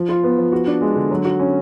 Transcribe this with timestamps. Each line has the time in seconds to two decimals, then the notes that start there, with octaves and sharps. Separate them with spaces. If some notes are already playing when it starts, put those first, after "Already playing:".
Already playing: F3
0.09 F4
0.23 B3
0.38 F3
0.52 F#4
0.67 D4
0.81 G#3
0.96 D3
1.11 F#3
1.25 F#4
1.39 C#4